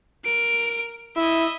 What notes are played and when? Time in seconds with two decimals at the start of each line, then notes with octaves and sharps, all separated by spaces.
0.25 A#4 D7
1.17 E4 D#5 E5